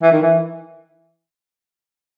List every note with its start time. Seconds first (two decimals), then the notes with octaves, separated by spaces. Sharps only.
0.02 E3
0.12 D#3
0.22 E3